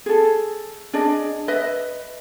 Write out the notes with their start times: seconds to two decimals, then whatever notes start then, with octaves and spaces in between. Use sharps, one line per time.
0.06 G#4 A4
0.93 D4 G#4 D5 D#5
1.48 B4 D#5 E5